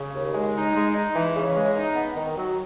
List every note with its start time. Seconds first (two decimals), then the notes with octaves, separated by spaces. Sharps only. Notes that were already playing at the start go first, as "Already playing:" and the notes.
Already playing: C#3
0.14 D#2
0.34 G#3
0.54 D#4
0.75 G#3
0.95 D#4
1.15 E3
1.35 C#3
1.55 G#3
1.76 D#4
1.95 B3
2.16 D#3
2.36 F#3